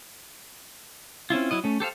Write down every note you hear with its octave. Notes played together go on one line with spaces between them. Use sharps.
C4 C#4 E4 F4
F#3 E4 D#5
A3 C#4
G4 A4 C5 F5